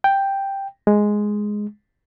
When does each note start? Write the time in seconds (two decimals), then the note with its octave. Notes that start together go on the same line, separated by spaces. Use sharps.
0.04 G5
0.87 G#3